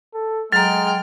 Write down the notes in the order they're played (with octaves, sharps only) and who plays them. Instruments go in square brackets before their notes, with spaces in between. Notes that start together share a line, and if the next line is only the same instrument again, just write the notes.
[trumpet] A4
[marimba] F#3 A#5 [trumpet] G#3 [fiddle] G5 F6